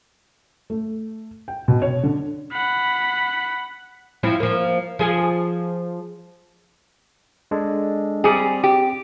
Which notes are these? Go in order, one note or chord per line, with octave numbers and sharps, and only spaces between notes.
A3
G5
B2
C#5
D3
F#5 B5
F3 C4 E4
F3 A#3
F3 G#4
G#3 D4 A4
G3 C4 G#4
G4